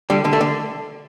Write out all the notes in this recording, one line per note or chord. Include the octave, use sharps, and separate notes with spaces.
D3 G3
D3
A3
D3